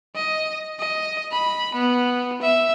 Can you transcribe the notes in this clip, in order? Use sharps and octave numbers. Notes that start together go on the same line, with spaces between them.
D#5
D#5
B5
B3
E5